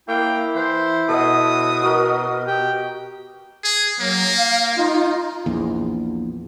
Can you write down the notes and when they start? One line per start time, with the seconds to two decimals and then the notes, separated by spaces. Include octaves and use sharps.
0.08 A#3 E4 G5
0.55 E3 C5
1.09 B2 A4 D#5 F#5 D#6
1.83 F#4 A#4 D#5
2.47 G4 G5
3.64 G#4
4.00 F#3 A#3
4.37 F5
4.77 D#4 F4
5.46 A#1 E2